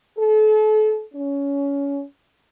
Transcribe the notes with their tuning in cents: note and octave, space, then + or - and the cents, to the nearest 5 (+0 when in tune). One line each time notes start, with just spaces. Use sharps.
A4 -35
C#4 +20